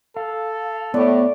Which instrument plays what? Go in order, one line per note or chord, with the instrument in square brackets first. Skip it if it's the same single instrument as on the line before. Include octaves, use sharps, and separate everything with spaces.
[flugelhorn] A4 [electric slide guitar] F5
[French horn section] A2 [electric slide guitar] B3 [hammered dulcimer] D5 C#6